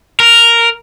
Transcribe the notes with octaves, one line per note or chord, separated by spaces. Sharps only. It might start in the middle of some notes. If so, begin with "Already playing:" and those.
A#4